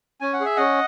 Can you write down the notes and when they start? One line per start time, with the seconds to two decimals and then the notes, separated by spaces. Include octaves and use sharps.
0.21 C#4 G#5
0.33 F#5
0.40 G#4
0.45 E5
0.56 C#4 D#5 F#5